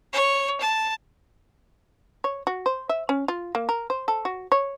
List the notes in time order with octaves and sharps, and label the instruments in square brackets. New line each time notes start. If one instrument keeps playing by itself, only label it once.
[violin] C#5
A5
[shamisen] C#5
F#4
C5
E5
C#4
F4
A#3
A#4
C5
A4
F#4
C#5